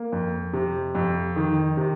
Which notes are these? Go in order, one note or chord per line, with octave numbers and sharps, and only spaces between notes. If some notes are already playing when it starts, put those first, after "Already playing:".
Already playing: A#3
F2
C3
F2
D#3
C3